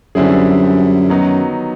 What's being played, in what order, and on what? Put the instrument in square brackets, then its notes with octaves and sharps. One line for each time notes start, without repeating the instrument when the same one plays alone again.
[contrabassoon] F#2 [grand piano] D3 G3 C4 E4 G#4
[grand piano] D#3 F#3 B3 D#4